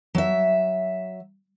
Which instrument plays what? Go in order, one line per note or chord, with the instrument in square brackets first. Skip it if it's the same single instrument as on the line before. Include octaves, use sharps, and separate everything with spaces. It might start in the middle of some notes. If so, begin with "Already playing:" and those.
[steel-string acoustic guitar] F#3 E5